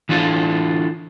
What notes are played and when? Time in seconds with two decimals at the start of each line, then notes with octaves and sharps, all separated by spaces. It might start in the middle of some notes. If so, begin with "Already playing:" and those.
0.09 E3 D4 F4 A4